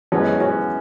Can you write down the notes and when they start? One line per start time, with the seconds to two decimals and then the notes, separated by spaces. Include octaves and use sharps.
0.12 F#2 E3 G#3 B3 C#4 F#4 G#4
0.40 C#4 F#4